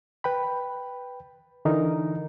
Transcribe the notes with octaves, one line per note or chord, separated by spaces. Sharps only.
B4 G5 B5
D3 E3 D#4 A#4